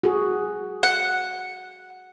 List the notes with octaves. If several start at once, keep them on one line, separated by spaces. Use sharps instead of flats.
F#4 G#4
F#5